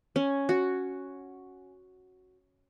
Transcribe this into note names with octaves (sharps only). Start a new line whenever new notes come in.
C#4
F#4